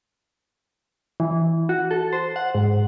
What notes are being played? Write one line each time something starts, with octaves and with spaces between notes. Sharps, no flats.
E3
F#4
A4
C5
F#5
G#2